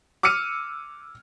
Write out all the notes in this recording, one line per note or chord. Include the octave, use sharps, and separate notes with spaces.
D6 E6 F6 C#7 D#7